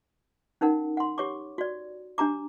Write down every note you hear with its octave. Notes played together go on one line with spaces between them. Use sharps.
C#4 D#4 A#4 F#5
F#5 C6
G4 C#5 C#6 D6
F#4 D5
D4 G4 A#5 D6